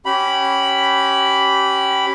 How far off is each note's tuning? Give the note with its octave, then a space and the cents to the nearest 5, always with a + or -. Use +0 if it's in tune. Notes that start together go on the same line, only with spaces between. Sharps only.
C#4 -15 G4 -25 B5 +0